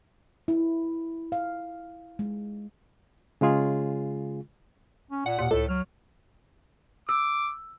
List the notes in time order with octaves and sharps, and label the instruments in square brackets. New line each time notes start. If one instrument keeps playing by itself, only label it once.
[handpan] E4
F5
G#3
[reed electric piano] C#3 G#3 F4 G#4
[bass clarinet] C#4
[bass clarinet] A#2 [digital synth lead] F#5
[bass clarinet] D#2 [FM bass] A#2
[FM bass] C#2 [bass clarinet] A2 [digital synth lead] A4
[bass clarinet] F#3 [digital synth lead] F6
[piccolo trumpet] D6 [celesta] E6